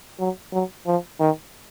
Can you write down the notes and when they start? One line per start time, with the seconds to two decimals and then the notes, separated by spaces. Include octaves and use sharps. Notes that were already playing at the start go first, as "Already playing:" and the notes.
0.19 F#3
0.53 F#3
0.86 F3
1.20 D#3